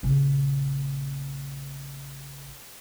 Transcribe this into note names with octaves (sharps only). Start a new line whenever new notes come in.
A#1 C#3